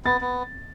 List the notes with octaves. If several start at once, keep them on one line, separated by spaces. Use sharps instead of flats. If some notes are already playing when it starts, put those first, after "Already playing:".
B3 A6
B3